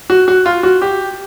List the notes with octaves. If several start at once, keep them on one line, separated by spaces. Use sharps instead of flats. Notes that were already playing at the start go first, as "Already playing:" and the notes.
F#4
F#4
F4
F#4
G4